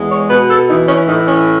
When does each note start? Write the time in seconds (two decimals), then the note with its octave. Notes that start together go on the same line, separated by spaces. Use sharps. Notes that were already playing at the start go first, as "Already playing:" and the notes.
Already playing: E2 G#3
0.10 C#5
0.29 B2 B4
0.49 A4
0.69 E3 D#4
0.87 C#4
1.07 A2 D#4
1.27 C#4